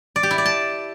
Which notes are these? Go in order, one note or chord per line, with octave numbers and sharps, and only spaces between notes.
D5
G4
E4
D5
A5